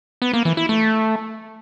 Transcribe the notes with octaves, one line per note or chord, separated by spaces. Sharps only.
B3
A#3
E3
E4
A3